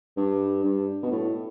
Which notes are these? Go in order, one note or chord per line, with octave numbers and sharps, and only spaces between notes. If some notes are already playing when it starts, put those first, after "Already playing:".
G2
G2
B2
A2